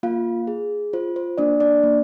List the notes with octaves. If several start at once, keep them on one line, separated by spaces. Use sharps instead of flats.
A#3 F4 F5
G#4
F4 C5
C5
A#3 D4 D5
D4 D5
A#3